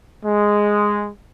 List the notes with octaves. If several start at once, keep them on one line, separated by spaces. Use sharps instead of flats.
G#3